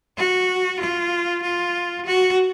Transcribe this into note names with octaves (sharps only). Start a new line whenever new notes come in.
F#4
F4
F4
F#4